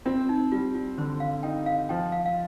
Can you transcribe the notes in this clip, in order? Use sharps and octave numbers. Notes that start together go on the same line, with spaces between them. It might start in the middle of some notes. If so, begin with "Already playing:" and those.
C4 F4
D#4
G3 F4
F4
D3 C5
F5
D#4 G5
F5
F3 G5
F5
F5